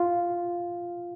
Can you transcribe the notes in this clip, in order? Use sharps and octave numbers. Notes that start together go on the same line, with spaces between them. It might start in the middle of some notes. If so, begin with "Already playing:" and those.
Already playing: F4